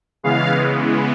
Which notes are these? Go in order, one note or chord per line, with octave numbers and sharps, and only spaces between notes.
C#3 E3 G#3 B3 F5